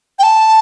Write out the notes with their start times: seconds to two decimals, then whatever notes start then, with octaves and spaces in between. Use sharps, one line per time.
0.19 G5
0.23 A5